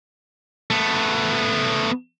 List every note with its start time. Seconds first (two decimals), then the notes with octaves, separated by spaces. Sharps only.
0.70 A3 B3